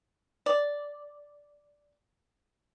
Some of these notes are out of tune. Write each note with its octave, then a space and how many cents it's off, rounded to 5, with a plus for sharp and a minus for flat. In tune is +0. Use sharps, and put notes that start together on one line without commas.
D5 -5